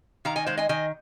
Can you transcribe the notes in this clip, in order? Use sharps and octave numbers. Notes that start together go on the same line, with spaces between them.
D#3 F5 A#5
D#5 G#5
G#3 C5 F5
D#5 G#5
D#3 D#5 G#5